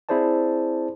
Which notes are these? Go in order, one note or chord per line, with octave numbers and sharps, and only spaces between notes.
C4 E4 G#4 C5 D5 A5